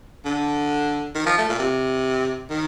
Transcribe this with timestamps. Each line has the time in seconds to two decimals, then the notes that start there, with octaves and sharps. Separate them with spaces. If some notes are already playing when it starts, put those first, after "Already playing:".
0.25 D3
1.15 D#3
1.26 F3
1.38 A3
1.49 A#2
1.59 C3
2.51 D#3